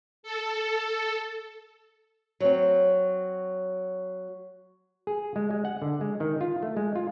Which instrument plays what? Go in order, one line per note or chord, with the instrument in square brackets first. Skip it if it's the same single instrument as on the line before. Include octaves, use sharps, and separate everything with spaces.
[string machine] A4
[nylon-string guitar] F#3 C4
[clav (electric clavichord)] G#4
G#3
G#3
F#5
D3
G#3
D#3
F4
A3
G#3
F4